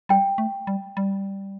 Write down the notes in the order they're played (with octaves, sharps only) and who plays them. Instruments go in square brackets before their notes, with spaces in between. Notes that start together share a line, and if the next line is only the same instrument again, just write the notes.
[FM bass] G3 [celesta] G5
[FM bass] A3
G3
G3